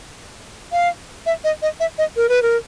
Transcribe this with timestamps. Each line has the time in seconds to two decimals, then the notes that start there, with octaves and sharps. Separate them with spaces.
0.72 F5
1.26 E5
1.44 D#5
1.62 D#5
1.80 E5
1.98 D#5
2.17 A#4
2.29 B4
2.42 A#4